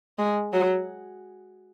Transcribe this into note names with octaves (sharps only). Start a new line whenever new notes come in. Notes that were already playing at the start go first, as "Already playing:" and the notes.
G#3
F#3